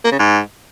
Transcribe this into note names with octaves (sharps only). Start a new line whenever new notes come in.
A#3
C#3
G#2